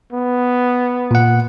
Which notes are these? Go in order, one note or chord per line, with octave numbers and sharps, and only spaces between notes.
B3
A#2 F#5